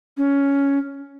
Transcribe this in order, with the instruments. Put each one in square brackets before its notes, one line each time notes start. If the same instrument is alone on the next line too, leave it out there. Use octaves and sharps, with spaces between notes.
[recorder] C#4